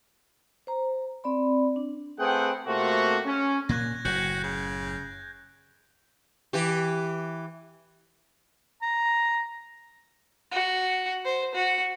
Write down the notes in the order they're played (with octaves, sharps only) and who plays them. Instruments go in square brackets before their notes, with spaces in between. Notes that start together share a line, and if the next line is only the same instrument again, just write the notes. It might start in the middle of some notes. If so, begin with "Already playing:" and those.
[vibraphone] C5 A#5
C4 D5 B5
D4
[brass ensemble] A3 C4 G#4 B4 F#5 G5
C3 A3 A#3 C4 F4 F#4
C#4
[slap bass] A#2 A#3 [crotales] F#6 G#6 A#6
[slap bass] F#1 A2 [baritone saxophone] F#4 [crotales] G6
[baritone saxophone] C#3
[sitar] E3 G4
[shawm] A#5
[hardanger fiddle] F#4
C5
F#4